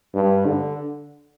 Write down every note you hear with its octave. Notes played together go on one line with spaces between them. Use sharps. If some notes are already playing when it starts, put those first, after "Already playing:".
G2
D3